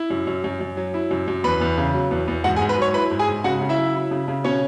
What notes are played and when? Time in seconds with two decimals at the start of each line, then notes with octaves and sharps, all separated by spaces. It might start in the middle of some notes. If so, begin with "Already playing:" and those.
Already playing: E4
0.10 F#2
0.27 F#2
0.44 F#2
0.60 F#2
0.77 F#3
0.94 E4
1.11 F#2
1.28 F#2
1.44 E2 B4 B5
1.61 E2
1.78 C#3
1.94 F#3
2.11 E2
2.28 E2
2.44 G#2 F#4 F#5
2.56 G#4 G#5
2.61 G#2
2.69 B4 B5
2.78 F#3 C#5 C#6
2.94 E4 B4 B5
3.11 G#2
3.19 G#4 G#5
3.28 G#2
3.44 C#3 F#4 F#5
3.61 C#3
3.69 E4 E5
3.78 F#3
3.95 E4
4.11 C#3
4.28 C#3
4.44 B2 C#4 C#5